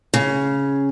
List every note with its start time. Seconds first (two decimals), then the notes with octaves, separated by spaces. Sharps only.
0.14 C#3